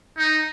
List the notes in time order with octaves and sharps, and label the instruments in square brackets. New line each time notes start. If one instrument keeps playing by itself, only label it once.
[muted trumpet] D#4